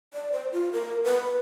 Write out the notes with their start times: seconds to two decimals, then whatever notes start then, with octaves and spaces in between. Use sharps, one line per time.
0.14 D5
0.32 C5
0.52 F4
0.73 A#4
1.05 B4